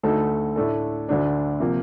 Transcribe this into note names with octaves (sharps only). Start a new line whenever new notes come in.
D2 D3 A3 D#4 A4
A2 A3 D4 A4
D2 D3 A3 D4
C3 F3 A#3